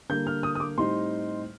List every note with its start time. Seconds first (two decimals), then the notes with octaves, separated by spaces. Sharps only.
0.09 D3 G3 A#3 G6
0.27 F6
0.43 D#6
0.55 D#6
0.60 D6
0.77 A2 G3 C4 D#4 C6